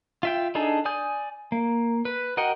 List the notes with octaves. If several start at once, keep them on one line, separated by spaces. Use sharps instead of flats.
F4 E5 G5
D4 D#4 G#4 A4
D5 G#5 D#6 G6
A#3
B4
F#4 A#4 D#5 F#5 G5